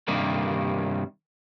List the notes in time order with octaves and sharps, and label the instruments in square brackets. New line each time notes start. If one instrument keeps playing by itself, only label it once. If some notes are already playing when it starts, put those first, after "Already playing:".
[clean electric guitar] G2 C3 D#3 G3 A#3